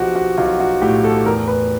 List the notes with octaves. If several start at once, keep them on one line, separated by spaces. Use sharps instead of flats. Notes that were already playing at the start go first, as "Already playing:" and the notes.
Already playing: B1 F3 F#4 G4
F#4
B1 F4
F#4
A2 G4
A4
E2 A#4
B4